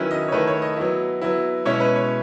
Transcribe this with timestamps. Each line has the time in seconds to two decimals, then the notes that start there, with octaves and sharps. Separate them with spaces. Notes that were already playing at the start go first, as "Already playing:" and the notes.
Already playing: D#3 F#3 C#4 E4 B4
0.11 D#5
0.28 C#5
0.32 D#3 A3 E4 B4
0.47 C#5
0.62 D#5
0.76 F#3 B3 E4
1.21 F#3 B3 E4
1.65 B2 G#3 C#4 E4 C#5
1.80 B4
1.95 C#5